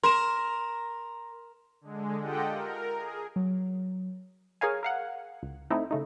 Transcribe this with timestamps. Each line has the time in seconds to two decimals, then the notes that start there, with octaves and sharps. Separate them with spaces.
0.04 A#4 C6 E7
1.81 D3 G#3
2.21 F4 G4 A4 D#5 F#5 G5
2.51 A#4
2.96 G#4
3.36 F#3
4.61 G#4 A#4 C#5 F5 G#5
4.83 A#4 F5 F#5
5.43 C#2
5.70 A3 C4 D#4 E4
5.91 C#3 A3 D#4